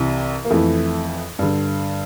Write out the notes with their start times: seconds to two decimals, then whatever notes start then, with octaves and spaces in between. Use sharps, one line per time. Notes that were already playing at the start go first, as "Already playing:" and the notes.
Already playing: C2 C3 E3
0.45 A#3
0.50 F2 E3 A3
1.39 G2 D3